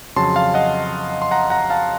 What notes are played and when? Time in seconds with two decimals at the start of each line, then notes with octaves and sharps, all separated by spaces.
0.16 F2 C#3 F#3 A5 C6
0.36 F5 A5
0.54 D#5 F#5
1.22 C6
1.31 F#5 A#5
1.50 F#5 A#5
1.70 F5 A5